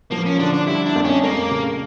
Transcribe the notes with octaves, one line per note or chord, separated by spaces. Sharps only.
F3 A#3
C#4
D3 D4
D4
G3 E4
D4
F2
C#4
A3 A#3
C#3